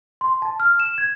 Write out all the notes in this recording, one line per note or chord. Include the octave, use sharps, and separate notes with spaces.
C6
A5
F6
E7
G#6